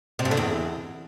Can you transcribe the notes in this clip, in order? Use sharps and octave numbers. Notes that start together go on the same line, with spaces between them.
C3
G2
D3
E2